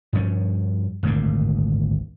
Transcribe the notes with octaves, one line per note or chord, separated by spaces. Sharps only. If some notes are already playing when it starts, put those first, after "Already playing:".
G2 F3 C#4
G#1 D2 G2 A#2